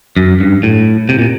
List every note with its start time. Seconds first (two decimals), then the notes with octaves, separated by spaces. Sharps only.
0.17 F#2
0.40 G2
0.63 A2
1.09 C3
1.19 A#2